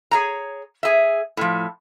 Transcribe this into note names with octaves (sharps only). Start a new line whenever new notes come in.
G#4 C#5 A#5
G#4 E5
A2 F3